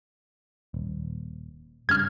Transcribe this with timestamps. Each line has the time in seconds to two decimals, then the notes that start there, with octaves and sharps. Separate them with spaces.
0.74 D#1
1.89 G2 C#3 F6 G#6